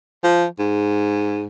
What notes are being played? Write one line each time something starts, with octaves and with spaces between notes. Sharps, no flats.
F3
G#2